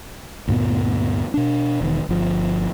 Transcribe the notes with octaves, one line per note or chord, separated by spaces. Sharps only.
D2 G2 A#2 B3
B2 D4
E1 D#3
G1 F3